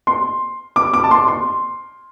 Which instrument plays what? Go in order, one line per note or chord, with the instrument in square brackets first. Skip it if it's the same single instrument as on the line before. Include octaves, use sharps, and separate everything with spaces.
[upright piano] C6
D6
D6
A5
C6
C6